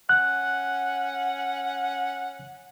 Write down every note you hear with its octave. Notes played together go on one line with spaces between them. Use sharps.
C#4 F#5 F#6